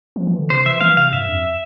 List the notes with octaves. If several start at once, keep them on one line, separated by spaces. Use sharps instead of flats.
F3
E3
D3
C3 C5
E3 E5
E3 F5
C3 F5
G2 E5
F2